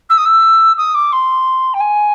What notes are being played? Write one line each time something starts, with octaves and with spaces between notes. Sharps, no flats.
E6
D#6
E6
D#6
D6
C6
G5
G#5